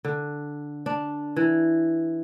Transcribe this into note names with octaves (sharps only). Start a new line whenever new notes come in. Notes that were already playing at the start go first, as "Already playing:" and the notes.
D3
D4
E3